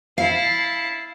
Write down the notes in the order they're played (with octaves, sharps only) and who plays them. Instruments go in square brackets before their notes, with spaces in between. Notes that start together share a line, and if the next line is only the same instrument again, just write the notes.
[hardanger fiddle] E4 A5 [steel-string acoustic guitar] F5 [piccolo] C7